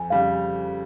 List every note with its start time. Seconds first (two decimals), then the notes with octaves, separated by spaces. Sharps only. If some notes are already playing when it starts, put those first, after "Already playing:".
Already playing: F2 G#5
0.10 C#3 G3 F5